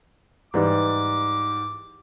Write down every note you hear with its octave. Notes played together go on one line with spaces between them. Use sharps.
G#2 E3 G3 D6